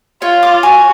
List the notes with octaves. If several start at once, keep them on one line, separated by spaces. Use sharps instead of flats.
F4 C#5
D6
F#4 G#5